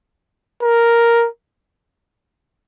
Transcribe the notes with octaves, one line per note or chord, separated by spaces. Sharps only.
A#4